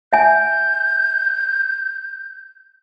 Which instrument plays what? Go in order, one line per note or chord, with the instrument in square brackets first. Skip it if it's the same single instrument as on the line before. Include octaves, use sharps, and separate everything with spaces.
[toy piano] E5 G#5 [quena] G6